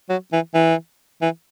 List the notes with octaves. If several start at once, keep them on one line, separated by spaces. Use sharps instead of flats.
F#3
E3
E3
E3